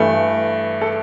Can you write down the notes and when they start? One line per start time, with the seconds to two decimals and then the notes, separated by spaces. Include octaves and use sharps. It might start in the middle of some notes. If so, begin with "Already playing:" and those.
Already playing: G2 E3 A3
0.82 A4